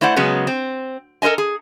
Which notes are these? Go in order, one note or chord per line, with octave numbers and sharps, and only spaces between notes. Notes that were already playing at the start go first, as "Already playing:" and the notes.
A3 E4 C5 D5 F#5
C#3 F#3 G#3 B3 C#4
C4
A4 A#4 C5 D#5 G#5
G#4